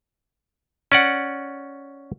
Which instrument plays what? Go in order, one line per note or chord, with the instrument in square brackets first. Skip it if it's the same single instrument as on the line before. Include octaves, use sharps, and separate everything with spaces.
[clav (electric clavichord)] C#4 D5 F#5